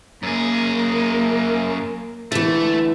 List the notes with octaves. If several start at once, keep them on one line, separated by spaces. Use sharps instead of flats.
F#2 A#3 G#4
D3 E3 A3